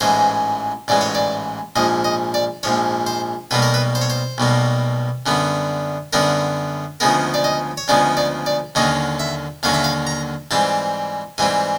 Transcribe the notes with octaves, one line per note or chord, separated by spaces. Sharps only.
A1 G#2 E3 G#3 C5
A1 G#2 E3 G#3 D5
C#5
D5
A#1 G#2 F3 D#5
D#5
D5
A#1 G#2 F3 C#5
C5
B1 B2 G3 A#3 B4
A#4
B4
C5
C#5
C5
B1 B2 G3 A#3
F#2 D3 G3 B3
F#2 D3 G3 B3 A#4
D2 C#3 F3 G#3 B3 A#4
D5
D#5
C#5
D2 C#3 F3 G#3 B3 D5
D5
D5
D#2 D3 F#3 A#3 C#4 D#5
E5
D#2 D3 F#3 A#3 C#4 F5
E5
F5
A#5
G#2 E3 G3 C4 A5
G#2 E3 G3 C4 G#5